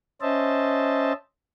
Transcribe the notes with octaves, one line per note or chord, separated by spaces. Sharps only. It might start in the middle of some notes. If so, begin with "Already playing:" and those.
C#4 C5 D#5 E5 A5